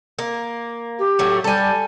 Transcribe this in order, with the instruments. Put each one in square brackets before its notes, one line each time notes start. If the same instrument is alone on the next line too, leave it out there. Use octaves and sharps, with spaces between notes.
[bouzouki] A#3
[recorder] G4
[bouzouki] A2 F#3 A3
[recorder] G3 [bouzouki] A4 G#5